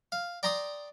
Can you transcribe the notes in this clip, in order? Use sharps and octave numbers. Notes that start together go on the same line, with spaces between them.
F5
D5 G5 A#5 C6 D#6